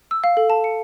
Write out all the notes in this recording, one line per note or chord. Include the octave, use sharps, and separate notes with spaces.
E6
F5
A4
A5
C#7